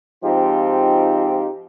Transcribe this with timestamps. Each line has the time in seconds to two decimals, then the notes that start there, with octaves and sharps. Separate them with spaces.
0.24 G#2 F3 C4 D#4 F4 G4